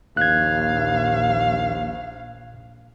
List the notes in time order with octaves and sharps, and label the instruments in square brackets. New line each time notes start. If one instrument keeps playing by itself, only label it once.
[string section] A#1 [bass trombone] D#2 [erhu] F5 [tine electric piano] F#6 G#6